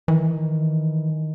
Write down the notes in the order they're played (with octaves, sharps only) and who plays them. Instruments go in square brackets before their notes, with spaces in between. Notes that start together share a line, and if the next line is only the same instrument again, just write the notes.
[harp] D#3 [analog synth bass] E3